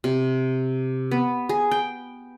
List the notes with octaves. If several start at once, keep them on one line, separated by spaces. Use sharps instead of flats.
C3
B3
G#4
G5